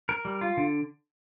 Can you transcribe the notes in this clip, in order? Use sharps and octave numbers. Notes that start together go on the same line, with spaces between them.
A#4
G3
F4
D3